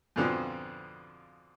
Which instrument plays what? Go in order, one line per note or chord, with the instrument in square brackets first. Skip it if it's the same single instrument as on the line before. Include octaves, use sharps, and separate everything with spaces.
[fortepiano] F2 G#2 B2 D3 F3 C4